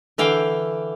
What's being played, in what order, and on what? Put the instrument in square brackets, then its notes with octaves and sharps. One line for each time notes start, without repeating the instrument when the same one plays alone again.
[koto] D3 E3 F5 G5